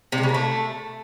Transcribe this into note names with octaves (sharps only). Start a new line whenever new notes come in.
C3
G#3
C#3
A#3
A3